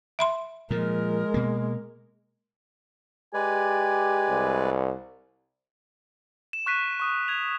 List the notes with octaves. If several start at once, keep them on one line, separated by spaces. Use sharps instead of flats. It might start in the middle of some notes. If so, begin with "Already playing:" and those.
E5 B5 C6
A#2 F3 G#3 A#4
B2 A#3
G#3 G4 B4 D5 G#5
C2
E7
C#6 F#6 B6 D#7
D#7
C#6 D#6 D#7
G#6 F7